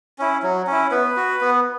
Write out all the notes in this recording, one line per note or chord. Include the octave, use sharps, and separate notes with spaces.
C#4 E4
F#3
C#4 E4
B3 B4
F#4
B3